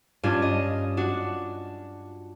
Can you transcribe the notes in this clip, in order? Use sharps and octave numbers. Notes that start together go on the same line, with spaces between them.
G2 C#4 D4 F4
D#5
D4 F#4